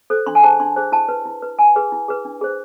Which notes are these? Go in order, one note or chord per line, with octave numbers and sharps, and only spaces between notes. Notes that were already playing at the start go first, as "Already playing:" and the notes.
A4 C5
D4 C6
G#5
G#4 C5 A5
D4 C6
G#4 C5
E4 A5
B4
E4
B4
E4 G#5
G#4 B4
E4
G#4 B4
D4
G#4 C5